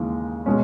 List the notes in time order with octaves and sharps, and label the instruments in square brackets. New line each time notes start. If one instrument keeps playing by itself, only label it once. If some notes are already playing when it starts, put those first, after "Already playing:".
Already playing: [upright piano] D#2 C#3 E3 G#3
B2 G#3 C#4